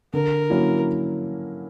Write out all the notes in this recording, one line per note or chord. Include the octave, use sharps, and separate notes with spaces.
D3 A#4
F#3 A#3 C#4 E4